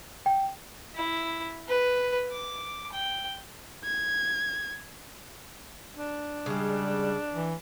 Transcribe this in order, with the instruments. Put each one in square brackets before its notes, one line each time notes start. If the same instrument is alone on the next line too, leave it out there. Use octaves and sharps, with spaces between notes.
[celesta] G5
[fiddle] E4
B4
D6
G5
[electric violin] G#6
[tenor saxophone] D4
[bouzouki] C#3 G#3 [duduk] G3
[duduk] E3